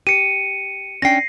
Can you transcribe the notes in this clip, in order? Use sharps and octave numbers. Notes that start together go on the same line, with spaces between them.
G4 C#7 D#7
C#4 D4 G5 A#6 C7